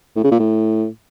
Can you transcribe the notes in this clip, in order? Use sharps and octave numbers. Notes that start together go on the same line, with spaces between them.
A2
C#3
A#2
A2